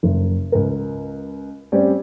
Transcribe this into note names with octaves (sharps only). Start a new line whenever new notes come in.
F#1
C#2 A#4
G3 C4 C#4 G4 C#5 D5